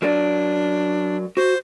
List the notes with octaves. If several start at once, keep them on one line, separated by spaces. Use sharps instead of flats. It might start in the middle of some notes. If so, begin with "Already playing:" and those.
F#3 D4 A#4 D5
F#4 C5